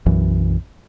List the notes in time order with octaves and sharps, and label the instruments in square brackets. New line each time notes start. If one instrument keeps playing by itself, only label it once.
[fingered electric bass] B1 F#2 E3